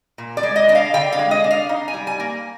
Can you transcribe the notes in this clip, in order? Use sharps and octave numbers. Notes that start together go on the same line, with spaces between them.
A#2
D5
G#3
D#5
D4 D#5
F5
D3 G5
F5
G#3
D#5
D4
F5
D#4
G#5
G3
G#5
A#3